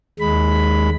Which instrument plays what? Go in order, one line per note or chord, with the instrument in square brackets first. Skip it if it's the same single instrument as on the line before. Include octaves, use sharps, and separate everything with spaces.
[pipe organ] D#2 G#3 B5